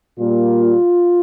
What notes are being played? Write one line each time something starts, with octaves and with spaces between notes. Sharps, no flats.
A#2 G3 A#3 F4